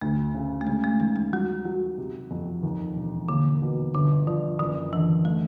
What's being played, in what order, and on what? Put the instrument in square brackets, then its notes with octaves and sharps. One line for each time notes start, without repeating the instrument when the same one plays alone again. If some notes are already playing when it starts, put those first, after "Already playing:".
[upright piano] D2 [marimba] A3
[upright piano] C#3
[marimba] A3
[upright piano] C#3 [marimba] G#3
[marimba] A3
[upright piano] D#2 [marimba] G#3
[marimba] G#3
[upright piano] F#3 [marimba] G3
[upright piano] F#3
C3
F2
D#2
E1
[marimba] D3 [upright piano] A#3
[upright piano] B2
[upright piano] G1 [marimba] D3
[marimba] D#3 [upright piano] F3
[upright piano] F#1 [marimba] D#3
[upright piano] D3 [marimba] E3
[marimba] F#3 [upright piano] A3